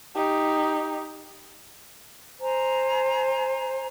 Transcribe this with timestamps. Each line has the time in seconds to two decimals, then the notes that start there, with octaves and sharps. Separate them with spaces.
0.16 D#4 G4
2.40 C5 G#5 A#5